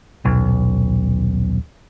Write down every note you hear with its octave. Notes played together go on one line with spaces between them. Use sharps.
D#1 B1